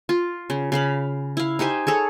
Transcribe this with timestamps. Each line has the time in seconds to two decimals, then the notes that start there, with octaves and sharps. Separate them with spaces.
0.09 F4
0.50 C#3
0.72 C#3 F5 B5
1.37 E4 F5
1.59 D#4 G4 C5 G#5
1.87 G#4 A4 C#5